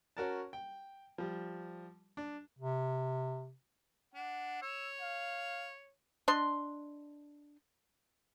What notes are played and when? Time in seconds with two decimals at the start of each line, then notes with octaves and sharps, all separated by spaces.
0.17 C#4 F#4 A#4 A5
0.53 G5
1.18 F3 G3
2.17 D4
2.59 C3
4.14 D4 F#5
4.62 C#5 E6
5.01 F5
6.28 D4 D#5 C6